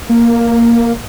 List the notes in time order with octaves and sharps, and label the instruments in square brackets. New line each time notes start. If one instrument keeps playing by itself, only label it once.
[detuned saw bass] A#3